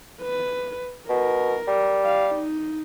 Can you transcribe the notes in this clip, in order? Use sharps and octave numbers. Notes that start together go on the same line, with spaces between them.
B4
B2 A#4
G3
F5
D#4